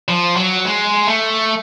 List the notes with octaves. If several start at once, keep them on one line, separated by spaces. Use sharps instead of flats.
F3
F#3
G#3
A3